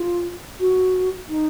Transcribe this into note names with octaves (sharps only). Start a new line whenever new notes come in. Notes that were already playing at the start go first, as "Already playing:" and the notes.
Already playing: F4
F#4
D#4